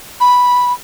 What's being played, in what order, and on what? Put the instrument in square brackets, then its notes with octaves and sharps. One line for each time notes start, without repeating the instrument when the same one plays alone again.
[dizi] B5